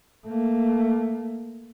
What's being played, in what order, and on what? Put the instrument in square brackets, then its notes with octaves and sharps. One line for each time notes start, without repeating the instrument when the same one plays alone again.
[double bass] A3 A#3